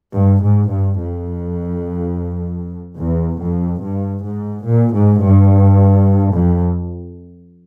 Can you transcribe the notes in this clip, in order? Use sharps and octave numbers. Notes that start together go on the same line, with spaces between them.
G2
G#2
G2
F2
E2
F2
G2
G#2
A#2
G#2
G2
F2